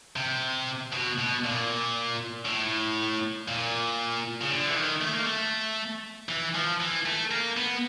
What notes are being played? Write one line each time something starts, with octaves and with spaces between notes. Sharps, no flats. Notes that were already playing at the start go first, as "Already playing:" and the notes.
C3
B2
B2
A#2
A2
A#2
C#3
D3
E3
D#3
A3
A#3
A3
E3
F3
E3
A3
A#3
B3